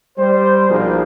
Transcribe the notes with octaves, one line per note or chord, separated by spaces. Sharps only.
G3 C5
A#1 B2 F3 A#3 D#4 G#4